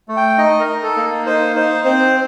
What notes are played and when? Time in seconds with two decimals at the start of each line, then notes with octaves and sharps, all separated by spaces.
0.09 A3
0.17 G5
0.38 D#4 D#5
0.60 A#4
0.68 D#4
0.83 A4
0.96 A#3
1.26 D#4 C5
1.55 D#4 C5
1.85 C4 C5